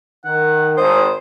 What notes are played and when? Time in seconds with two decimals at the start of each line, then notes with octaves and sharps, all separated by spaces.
0.25 D#3 F#5
0.77 G#1 C5 D#6